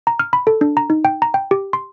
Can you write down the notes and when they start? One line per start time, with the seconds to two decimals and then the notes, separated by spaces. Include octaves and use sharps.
0.07 A#5
0.19 F6
0.33 B5
0.47 A4
0.61 D4
0.77 A#5
0.90 D#4
1.05 G5
1.22 A#5
1.34 G5
1.51 G4
1.73 C6